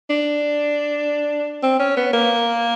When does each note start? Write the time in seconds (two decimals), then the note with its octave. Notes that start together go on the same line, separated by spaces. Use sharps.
0.10 D4
1.63 C4
1.80 C#4
1.97 B3
2.13 A#3